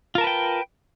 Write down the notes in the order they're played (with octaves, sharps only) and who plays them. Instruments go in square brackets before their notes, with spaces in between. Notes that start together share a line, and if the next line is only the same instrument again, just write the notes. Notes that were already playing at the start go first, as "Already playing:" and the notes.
[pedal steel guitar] F4
A#4
A5
B4
G5